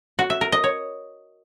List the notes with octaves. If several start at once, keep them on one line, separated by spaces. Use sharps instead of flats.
F#4
E5
A#4
D#5
C#5